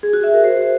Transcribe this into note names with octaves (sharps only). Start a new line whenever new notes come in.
G#4
F#4
E5
A#4
C5